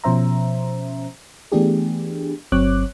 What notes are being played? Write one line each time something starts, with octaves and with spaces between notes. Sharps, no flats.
B2 F3 C#4 C5 E5 A#5
E3 A3 B3 D4 G4 G#4
G1 F#3 C4 C#5 D6 F#6